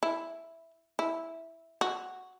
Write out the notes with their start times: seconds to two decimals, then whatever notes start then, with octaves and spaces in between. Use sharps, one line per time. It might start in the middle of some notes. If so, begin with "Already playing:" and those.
0.03 E4
0.99 E4
1.81 F#4